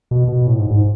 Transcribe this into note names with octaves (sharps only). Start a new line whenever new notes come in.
B2
B2
A2
G#2
G#2